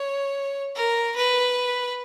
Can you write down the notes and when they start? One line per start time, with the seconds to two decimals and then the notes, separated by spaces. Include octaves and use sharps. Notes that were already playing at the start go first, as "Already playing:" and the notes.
Already playing: C#5
0.75 A#4
1.16 B4